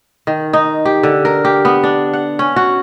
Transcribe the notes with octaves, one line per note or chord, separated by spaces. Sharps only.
D#3
D#4
G4
D3
A#4
G4
B3
D4
F#5
C#4
F#4